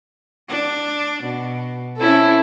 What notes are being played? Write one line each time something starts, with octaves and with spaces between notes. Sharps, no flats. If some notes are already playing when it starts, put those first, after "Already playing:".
D4
B2
C4 C#4 E4 A4